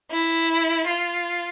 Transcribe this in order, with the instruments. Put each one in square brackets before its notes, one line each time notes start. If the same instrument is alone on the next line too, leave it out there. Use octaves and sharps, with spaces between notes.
[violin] E4
F4